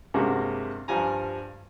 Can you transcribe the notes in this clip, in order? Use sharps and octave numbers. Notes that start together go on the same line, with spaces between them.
G2 C3 G#3 A#3 F#4
G2 F3 G3 G#5 A#5